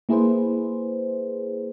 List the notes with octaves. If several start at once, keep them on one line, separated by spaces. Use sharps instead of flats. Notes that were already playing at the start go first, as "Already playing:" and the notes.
A#3 E4 G#4 B4 C5